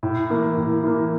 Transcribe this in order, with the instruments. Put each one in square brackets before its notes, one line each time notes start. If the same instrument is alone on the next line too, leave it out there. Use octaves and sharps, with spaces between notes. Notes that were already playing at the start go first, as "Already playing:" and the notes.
[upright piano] A2
E3 A#3
A2
E3 A#3